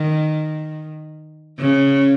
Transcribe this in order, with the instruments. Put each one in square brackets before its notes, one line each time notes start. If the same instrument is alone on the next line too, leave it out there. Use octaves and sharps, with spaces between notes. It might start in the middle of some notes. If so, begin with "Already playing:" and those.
Already playing: [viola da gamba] D#3
C#3